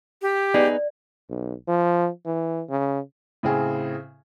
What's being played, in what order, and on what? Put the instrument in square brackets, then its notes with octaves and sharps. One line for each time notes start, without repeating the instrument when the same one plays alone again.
[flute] G4
[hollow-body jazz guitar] B3 D#4 G#4 [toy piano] D5
[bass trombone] B1
F3
E3
C#3
[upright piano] A2 C#3 C4 G#4